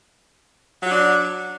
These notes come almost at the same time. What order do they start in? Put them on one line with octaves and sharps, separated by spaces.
F#3 F#4 D4